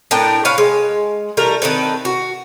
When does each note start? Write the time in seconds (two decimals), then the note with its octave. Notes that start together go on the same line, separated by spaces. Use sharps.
0.11 A2 D4 A#4 G5
0.45 B4 C#5 F5
0.58 G#3
1.37 E3 G3 A3 A#4
1.62 D#3 C4 A4 B4
2.05 F#4